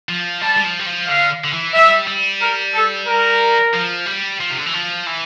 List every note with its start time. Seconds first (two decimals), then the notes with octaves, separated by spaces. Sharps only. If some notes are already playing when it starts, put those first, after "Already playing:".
0.09 F3
0.41 G3 A5
0.57 G3
0.64 F3
0.79 G3
0.86 F3
1.08 D3 F5
1.44 D3
1.53 E3
1.74 G3 E5
2.07 G3
2.42 A#4
2.75 A4
3.07 A#4
3.74 F3
4.06 G3
4.40 F3
4.50 C3
4.57 D3
4.66 E3
4.73 F3
5.07 E3